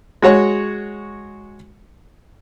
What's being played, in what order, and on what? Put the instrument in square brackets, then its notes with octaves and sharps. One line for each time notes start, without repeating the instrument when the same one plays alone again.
[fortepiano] G#3 F#4 C#5 C#6